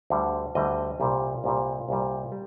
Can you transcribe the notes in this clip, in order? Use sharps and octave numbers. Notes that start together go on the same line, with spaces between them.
D2 D3 G3
D2 D3 G3 D#5
C2 A#2 G3
C2 A#2 G3
C2 A#2 G3
G3